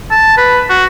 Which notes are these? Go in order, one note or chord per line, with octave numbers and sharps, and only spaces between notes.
A5
B4
F#4